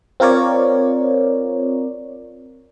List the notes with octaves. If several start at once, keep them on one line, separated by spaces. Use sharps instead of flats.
C4 F4 A#4 C#5 D5